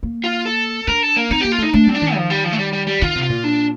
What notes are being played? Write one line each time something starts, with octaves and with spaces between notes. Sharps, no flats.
A#3
F4
A4
D4 A#4
A4
A#3
C4 D#4
A#3 G4
F4
A3 D#4
A3 D4
G3 C4
D4
D#3
F3
G3
F3
A3
G3
G3
G3
D#3 F4
C3
F4
A#2
D4